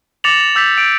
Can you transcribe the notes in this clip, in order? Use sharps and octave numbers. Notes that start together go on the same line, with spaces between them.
D6 A6 A#6 C#7 F7 F#7
D6 E6 G6 A6 B6 F7
E6 G6 D7